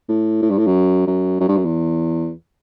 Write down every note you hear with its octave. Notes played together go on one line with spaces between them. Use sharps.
A2
A2
G2
A2
F#2
F#2
F#2
G2
F#2
E2